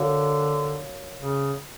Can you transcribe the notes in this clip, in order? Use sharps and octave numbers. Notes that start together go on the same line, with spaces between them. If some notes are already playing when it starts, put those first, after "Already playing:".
Already playing: D3 F#4 A#4 C#5 F5
C#3